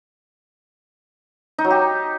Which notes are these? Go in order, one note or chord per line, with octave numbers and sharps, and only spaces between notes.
D#4
F#3
G4